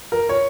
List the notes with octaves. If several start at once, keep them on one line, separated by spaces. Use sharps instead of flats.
A#4
C#5